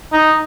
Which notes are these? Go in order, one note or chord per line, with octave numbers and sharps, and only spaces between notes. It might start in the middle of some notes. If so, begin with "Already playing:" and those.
D#4